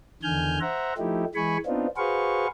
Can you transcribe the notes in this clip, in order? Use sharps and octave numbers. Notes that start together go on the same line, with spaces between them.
E2 D3 D#3 G#5 F6 G6
C5 E5 F#5 A#5
F3 A3 D#4 E4 G4
E3 G#3 G#5 B5 C#6
B3 C4 D4 D#4 F4
F#4 G#4 B4 C5 F5 C#6